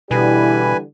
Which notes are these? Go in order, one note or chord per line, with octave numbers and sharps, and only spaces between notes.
B2 D3 E3 G3 E4 B4 G#5